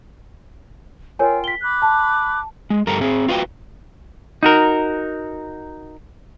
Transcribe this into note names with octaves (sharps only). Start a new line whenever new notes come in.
F4 A#4 C#5 G5 G#5
B6 G7
B5 D6 F#6
A5
G#3
G2 G3 A4 A#4 A#5
C4 G#4
F4 F#4 B4 G5
D#4 F#4 A#4